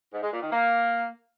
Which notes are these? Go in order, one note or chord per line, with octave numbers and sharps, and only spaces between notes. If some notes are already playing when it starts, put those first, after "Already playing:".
G#2
G#3
A#2
D#3
A#3